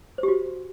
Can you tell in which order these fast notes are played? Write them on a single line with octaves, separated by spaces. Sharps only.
C5 G4 F#4